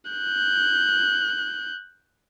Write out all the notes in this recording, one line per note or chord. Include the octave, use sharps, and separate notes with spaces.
F#6 G6